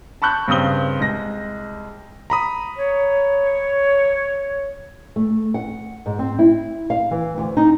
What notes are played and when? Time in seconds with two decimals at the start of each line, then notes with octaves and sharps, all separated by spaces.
0.22 A5 B5 C#6 F#6 G6
0.48 G2 C#3 C4 D#6 G7
0.99 C2 G#3 A#6
2.30 A#5 B5 D#6
2.76 C#5
5.16 A3
5.54 F#5
6.06 G#2
6.19 C4
6.39 E4
6.90 F5
7.11 E3
7.38 D2
7.57 D#4